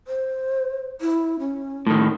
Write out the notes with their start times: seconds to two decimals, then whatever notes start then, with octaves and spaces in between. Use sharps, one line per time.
0.07 C5
1.01 E4
1.39 C#4
1.87 A2 D#3